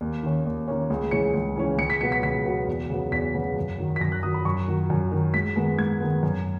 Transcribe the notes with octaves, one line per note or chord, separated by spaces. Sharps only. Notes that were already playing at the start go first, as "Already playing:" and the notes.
D#2
D#3 A#3 C#4
D#2
D#3 A#3 C#4
C#2
C#3 E3 G#3 C#4 C#7
C#2
C#3 E3 G#3 C#4
C#2 C#7
B6
B2 F#3 B3 C#7
B6
C#2 B6
B2 F#3 B3
E2
C#3 F#3 B3
E2 B6
C#3 F#3 B3
F#2
D#3 F#3
B6
F#2 A#6
F#6
D#3 F#3 D#6
B5
F#2 C#6
D#3 F#3
F#2
D#3 F#3
G#2 B6
D#3 G#3 B3
G#2 G#6
D#3 G#3 B3
F#2